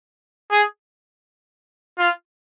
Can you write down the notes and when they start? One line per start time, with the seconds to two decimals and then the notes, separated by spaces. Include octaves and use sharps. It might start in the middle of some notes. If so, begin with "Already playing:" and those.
0.51 G#4
1.98 F4